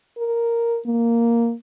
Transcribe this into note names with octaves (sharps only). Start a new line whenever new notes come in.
A#4
A#3